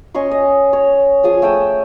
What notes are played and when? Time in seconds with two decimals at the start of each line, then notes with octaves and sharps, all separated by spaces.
0.14 C#4 D#5 C6 C#6
0.31 D#5
0.73 C#5
1.24 F3 G#4 G#5 D#6
1.42 A3 G5 D#6 E6